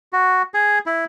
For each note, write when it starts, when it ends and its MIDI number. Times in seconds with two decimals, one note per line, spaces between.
0.13 0.42 66
0.54 0.79 68
0.86 1.05 64